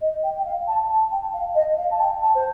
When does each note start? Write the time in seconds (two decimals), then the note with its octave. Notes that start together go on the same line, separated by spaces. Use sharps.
0.01 D#5
0.23 G5
0.38 G5
0.45 F5
0.67 A5
0.89 A5
1.11 G5
1.33 F5
1.55 D#5
1.77 F5
1.91 A5
2.00 G5
2.21 A5
2.34 C5